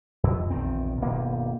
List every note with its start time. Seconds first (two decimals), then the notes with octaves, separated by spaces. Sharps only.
0.24 F2
0.50 A#1 E2 D#3 C4
1.01 D#1 G2 B2 A#3